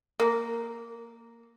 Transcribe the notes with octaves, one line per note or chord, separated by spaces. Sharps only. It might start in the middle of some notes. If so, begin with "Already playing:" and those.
A#3